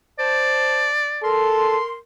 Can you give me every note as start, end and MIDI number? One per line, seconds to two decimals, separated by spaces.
0.19 0.89 72
0.19 1.34 74
0.19 0.89 81
1.23 1.79 69
1.23 1.97 70
1.23 1.97 84